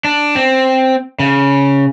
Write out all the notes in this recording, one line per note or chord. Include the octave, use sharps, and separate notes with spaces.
D4
C4
C#3